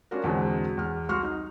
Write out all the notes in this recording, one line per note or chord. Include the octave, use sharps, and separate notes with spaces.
C#4 D4 F4 F#4 A#4
E2 G#2 B2 D3 G#3 C4
E2 F6
C2 F#4 C6 C#6 F6
D#4